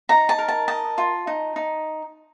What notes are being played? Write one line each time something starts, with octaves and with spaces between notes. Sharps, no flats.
D#4 A#5
A5
A#4
A5
D#5 A5
F4
D#4
D#4